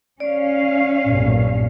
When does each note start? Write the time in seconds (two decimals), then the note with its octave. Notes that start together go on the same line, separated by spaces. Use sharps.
0.20 C#4 D5 F5
1.07 B1 G2 A#2